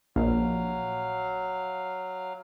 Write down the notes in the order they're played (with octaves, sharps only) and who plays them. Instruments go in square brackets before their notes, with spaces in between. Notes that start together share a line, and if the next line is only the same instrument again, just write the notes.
[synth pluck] A#1 [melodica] F#3 F5